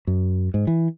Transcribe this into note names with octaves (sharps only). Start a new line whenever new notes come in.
F#2
G#2
E3